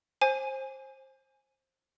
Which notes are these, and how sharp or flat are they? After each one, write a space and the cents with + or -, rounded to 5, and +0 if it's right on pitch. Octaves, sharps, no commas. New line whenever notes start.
C5 +20 G#5 +0